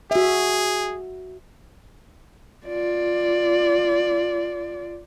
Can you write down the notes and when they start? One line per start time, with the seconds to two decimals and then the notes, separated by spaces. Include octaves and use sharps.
0.11 F#4 G#4 E5
2.67 F4 D5